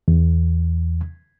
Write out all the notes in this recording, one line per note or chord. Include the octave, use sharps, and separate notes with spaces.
E2